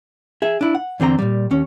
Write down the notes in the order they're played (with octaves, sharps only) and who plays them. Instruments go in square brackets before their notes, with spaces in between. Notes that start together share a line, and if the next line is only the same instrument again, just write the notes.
[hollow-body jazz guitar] G#4 E5
D4 E4
F#5
E2 D3 C4 G4 A#5
A#2 F#3 G3
D#2 C#4